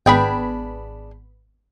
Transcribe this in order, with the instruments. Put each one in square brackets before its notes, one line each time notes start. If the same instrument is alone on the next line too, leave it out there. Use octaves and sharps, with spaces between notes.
[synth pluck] G#1 B3 B5 [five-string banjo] D4 G#4 G5